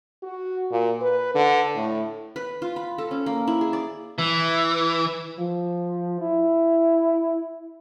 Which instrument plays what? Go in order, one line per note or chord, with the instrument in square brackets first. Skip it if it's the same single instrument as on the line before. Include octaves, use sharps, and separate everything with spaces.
[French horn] F#4
A#2
B4
D3
A2
[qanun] B4
F4
B5
A4
C#4
A#3
E4
G#4
D5
[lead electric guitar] E3
[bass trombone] F3
E4